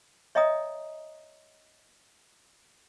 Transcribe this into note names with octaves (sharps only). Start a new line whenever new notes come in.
C#5 D#5 E5 G5 A#5 D#6